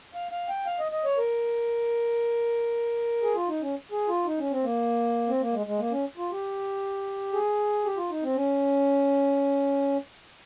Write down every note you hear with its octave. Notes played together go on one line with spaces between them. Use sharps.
F5
F5
G5
F5
D#5
D#5
C#5
A#4
G#4
F4
D#4
C#4
G#4
F4
D#4
C#4
C4
A#3
C4
A#3
G#3
G#3
A#3
C#4
F4
G4
G#4
G4
F4
D#4
C4
C#4